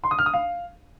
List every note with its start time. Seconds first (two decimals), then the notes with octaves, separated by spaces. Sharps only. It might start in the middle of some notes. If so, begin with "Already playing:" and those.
0.04 C6
0.11 D#6
0.19 F6
0.26 D#6
0.34 F5